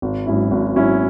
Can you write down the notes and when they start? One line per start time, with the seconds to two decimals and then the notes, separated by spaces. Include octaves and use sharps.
0.02 G#1
0.27 G#2 F#3 C#4 E4
0.51 G#1
0.75 G#2 F#3 C#4 E4